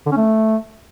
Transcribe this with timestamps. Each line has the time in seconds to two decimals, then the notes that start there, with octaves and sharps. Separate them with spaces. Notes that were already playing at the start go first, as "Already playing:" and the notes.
0.06 D3
0.11 C#4
0.17 A3